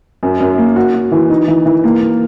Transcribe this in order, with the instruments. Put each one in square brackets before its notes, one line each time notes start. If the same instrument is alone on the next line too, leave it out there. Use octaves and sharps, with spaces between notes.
[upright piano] F#2
F#2
A#3
F#4
F#4
E3
D#4
E3
E3
A#3
A#3